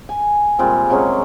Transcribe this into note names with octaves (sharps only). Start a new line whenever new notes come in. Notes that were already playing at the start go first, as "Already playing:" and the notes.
G#5
A#2 G3 G#3 C4
C3 F#3 G#3 C#4